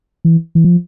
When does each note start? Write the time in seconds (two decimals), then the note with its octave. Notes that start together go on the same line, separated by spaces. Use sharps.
0.25 E3
0.55 E3
0.64 F3